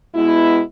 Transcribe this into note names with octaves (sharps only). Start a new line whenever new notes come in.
B2 G#3 B3 E4